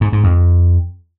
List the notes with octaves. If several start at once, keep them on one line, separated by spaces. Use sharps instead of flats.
G#2
G#2
F2